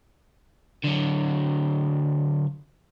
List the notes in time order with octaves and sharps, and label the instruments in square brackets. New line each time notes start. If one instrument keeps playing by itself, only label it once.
[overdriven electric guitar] D3 F#3